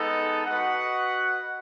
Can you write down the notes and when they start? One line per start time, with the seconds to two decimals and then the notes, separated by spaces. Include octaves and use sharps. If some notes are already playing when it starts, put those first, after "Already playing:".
Already playing: G#3 B3 D#4 A4 D#5
0.46 F#4 B4 D#5 F#5